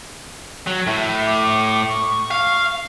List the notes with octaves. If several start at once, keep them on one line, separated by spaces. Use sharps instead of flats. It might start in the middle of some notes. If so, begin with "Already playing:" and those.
F#3
A2 E5
D6
C#6
F5